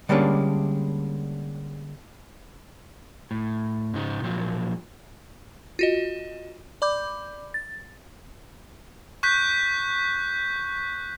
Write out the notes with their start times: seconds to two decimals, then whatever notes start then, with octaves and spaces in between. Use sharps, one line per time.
0.09 D3 G3 G#3 A#3 C#4 D4
3.31 A2
3.94 G#2 C#3 D#4
4.22 A#2 F3 F#3
5.79 F4 F#4 D#5
6.82 D5 B5 D6 G6
7.54 A6
9.23 C#6 F#6 G6 B6